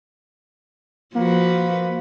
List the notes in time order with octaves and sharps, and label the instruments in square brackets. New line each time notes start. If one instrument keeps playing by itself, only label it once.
[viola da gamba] F3 F#4 B4 [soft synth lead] A#3